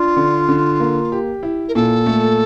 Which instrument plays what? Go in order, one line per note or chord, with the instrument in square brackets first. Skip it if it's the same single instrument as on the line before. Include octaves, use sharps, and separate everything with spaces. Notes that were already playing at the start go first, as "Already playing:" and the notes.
Already playing: [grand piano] D4 [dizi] F4
[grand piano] D3
D3
A#3
G4
E4
[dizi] A#4
[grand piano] A#2 [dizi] A4
[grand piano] A3